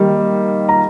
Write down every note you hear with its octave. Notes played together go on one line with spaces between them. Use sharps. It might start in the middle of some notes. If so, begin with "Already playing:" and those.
Already playing: D#3 G3 A#3
A#5